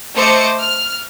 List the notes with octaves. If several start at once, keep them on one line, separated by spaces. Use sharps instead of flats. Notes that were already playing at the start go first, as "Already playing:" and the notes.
A3 C5 D#5 D6 C#7
F6